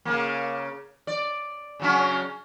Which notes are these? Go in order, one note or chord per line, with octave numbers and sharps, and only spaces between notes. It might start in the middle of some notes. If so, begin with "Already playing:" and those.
C#3 A#3
D5
C#3 F#3 C#4